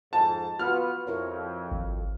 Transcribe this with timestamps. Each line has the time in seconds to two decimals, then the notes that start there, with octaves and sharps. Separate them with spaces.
0.13 F2 G#2 A5
0.59 B3 F4 F#4 B4 F6
1.07 F2 E4 A#4 C#5
1.72 G#1